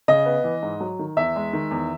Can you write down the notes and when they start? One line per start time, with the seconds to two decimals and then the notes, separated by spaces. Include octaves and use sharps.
0.08 C#3 D#5
0.26 B3
0.44 E3
0.63 G#2
0.80 F#3
0.99 D#3
1.17 E2 E5
1.36 G#3
1.53 D#3
1.71 E2